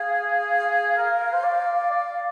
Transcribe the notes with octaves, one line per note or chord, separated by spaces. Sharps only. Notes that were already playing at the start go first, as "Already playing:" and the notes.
Already playing: G#4 F5
A#4
A#4
C5
D5
D5